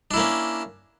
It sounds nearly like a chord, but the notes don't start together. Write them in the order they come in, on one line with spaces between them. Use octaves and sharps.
D4 E4 A#3 C#4